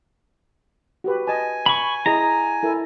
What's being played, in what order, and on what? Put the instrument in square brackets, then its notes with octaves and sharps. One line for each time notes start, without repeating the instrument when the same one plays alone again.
[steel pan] F#4 G4 B4
[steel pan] D#5 A5 [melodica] G#5
[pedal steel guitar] B5 C#6
[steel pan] E4 G#4 D#5 [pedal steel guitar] A#5
[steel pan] E4 A4 A#4